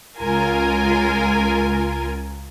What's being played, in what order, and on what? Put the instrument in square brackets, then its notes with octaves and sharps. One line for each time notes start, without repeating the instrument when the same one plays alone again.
[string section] C#2 F4 A#4 G#5